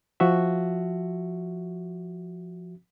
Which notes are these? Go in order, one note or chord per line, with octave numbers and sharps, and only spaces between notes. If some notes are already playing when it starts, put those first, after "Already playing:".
F3 F#4 E5